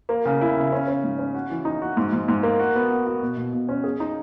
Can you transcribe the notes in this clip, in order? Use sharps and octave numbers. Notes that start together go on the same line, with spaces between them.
A#3
C#3
E4
C#3
C#4
C#4
G#2
C#4
F#4
E3
D#4
F#4
G#2
G#2
G#2
A#3
F#4
B3
F#4
F#4
B2
B2
B2
C#4
G#4
D#4